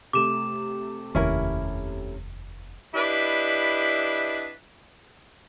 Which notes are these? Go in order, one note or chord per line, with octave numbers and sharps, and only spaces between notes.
C3 A3 D6 E7
F1 D#2 C#4 E4 A#4
D4 E4 G4 B4 D5 D#5